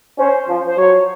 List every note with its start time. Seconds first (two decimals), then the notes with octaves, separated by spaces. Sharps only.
0.19 C#4 C5
0.48 F3
0.67 C5
0.78 F#3 C#5